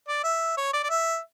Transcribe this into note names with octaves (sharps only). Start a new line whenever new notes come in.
D5
E5
C#5
D5
D5
E5